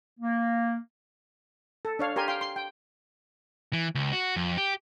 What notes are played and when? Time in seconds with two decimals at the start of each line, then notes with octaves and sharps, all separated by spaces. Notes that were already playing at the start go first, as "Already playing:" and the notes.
0.20 A#3
1.85 A4
1.99 D4 C#5 F5
2.16 G4 A#4 G#5 C6
2.28 F5 G5 C6
2.41 C6
2.56 G5
3.73 E3
3.95 C#2
4.13 F#4
4.36 F2
4.58 G4